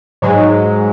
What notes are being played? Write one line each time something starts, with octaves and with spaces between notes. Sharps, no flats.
G#2 F#3 G#3